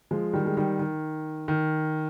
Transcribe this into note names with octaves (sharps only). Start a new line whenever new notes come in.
F3 G#3
D#3 G3
G#3
D#3 G3
D#3
D#3